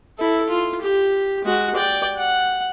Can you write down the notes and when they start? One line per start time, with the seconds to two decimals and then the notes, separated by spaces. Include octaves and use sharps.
0.18 E4 A4
0.49 F4
0.81 G4
1.45 G#3 F#4
1.75 D5 G5
2.17 F#5